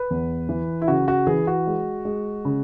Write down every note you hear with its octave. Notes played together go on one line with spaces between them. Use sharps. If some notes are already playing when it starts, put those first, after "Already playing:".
Already playing: B4
E2
E3
E4
C#3 F#4
F#4
E3 G#4
F#4
G#3
G#3
C#3